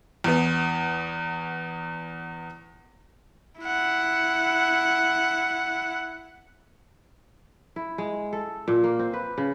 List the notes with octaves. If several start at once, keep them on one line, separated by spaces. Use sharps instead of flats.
E2 B3
E4 F#5
E4
G#3
A4
A#2
A#3
C4
B4
C#3